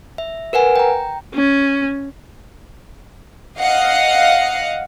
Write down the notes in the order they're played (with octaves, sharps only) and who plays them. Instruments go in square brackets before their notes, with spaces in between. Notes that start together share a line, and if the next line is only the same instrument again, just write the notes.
[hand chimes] E5
A#4 B4 F#5 G#5
G5 A#5
[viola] C#4
[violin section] D#5 F5 F#5